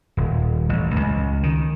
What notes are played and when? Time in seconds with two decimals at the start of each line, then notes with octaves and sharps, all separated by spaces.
0.17 D#1
0.69 A1
0.96 C#2
1.43 D#3